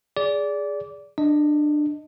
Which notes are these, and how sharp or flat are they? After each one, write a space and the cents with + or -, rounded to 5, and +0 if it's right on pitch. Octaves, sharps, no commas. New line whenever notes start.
G#4 -5 D5 -20
D4 +20 D#5 +0